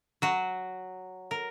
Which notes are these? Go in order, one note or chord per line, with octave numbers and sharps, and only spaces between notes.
F#3 F#4
A#4